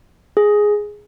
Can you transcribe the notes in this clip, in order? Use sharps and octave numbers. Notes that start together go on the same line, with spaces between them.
G#4